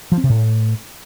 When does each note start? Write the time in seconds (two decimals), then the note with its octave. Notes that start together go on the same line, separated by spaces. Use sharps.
0.12 F3
0.18 C4
0.24 C3
0.30 A2